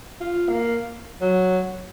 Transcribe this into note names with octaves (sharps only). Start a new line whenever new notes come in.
F4
A#3
F#3